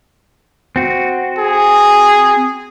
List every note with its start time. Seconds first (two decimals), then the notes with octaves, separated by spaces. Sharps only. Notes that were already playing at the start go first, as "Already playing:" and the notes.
0.76 C4 F#4
1.38 G#4